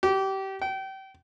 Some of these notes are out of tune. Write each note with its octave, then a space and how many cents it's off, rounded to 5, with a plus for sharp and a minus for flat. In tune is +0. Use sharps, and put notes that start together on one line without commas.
G4 -25
G5 -30